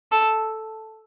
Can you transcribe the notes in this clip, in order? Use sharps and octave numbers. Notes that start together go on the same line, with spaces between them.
A4